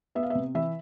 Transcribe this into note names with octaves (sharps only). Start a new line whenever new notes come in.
B3 E5
F5
E5
C3
E3 E5